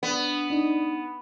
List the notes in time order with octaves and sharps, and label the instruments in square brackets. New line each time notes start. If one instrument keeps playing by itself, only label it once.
[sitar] B3 [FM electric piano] D4
[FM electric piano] D4 D#4